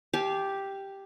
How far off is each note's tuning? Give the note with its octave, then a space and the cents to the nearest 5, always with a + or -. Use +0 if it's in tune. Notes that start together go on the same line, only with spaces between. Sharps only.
G4 +0 F5 -20 A5 -45